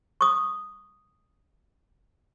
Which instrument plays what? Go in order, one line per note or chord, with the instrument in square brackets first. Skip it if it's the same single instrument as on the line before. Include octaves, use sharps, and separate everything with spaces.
[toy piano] C#6 D#6